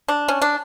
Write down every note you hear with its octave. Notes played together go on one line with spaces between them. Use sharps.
D4
C#4
D4